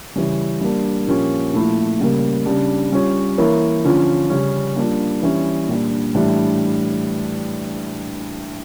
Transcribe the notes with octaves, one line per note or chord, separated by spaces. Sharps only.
C#3 E3 G3 C#4
G3 A#3 D4
A#2 F3 A#3 C#4 G4
A#2 F3 A3 E4
C#3 G3 A#3
C#3 G3 D4
G3 C#4 F4 C#5
E3 A#3 E4 A#4 C#5
D3 F3 C#4 F4
C#3 G3 C#4
G3 A#3 D4 F4
E3 G3 C#4
A#2 G3 D4
A2 E3 G3 D4